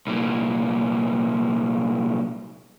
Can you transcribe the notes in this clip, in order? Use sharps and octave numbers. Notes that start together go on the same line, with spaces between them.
C2 A#2